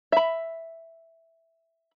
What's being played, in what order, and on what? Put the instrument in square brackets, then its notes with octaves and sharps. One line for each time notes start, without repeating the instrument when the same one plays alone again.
[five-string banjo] E5 B5